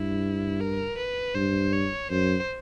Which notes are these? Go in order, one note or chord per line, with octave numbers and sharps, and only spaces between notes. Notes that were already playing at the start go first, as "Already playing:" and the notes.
Already playing: G2 E4
A#4
B4
G2 C5
C#5
F#2 C5